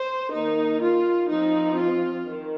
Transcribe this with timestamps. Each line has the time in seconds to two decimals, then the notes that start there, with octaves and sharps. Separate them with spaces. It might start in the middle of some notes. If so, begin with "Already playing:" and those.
Already playing: C5
0.33 D#3 A#3 D#4
0.82 F4
1.30 F3 C4 D#4
1.79 F4
2.28 D#3